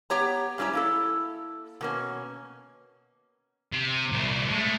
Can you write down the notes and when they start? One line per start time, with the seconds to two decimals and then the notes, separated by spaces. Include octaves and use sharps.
0.10 B3 G4 C#5 A#5
0.58 G#2 G3 C#4 E4 G4 A#5
0.73 A#3 E4 A4
1.81 B2 A#3 C#4
3.72 C3
4.12 C2 A#2
4.48 G#3 A3